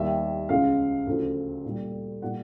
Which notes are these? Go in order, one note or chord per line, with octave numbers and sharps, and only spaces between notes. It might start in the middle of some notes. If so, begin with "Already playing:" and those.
Already playing: D#2 D#3 G3 E5
C#2 C#3 F3 G#3 F5
D2 C#3 F3
A#2 G3
A#2 G3 F#5